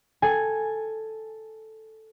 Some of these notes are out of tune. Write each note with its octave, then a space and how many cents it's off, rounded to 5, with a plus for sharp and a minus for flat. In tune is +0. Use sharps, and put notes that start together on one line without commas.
A4 +0 G#5 +0